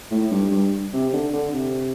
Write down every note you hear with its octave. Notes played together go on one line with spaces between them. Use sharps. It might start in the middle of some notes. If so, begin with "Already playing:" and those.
A2
G2
G2
C3
D3
D3
C3